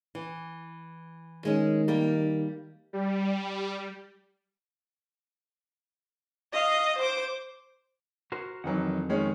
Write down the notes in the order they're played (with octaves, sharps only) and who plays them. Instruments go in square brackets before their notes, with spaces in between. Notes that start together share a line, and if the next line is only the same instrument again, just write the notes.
[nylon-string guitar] E3
[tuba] D#3 [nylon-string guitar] G#3 C#4
[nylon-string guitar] G3 A#3 A#4
[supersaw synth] G3
[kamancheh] D#5 F5
C5 D6
[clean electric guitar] F#4 A#4 C5
[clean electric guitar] F2 F#5 [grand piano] D#3 E3 F#3
[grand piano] D#3 G#3 C#4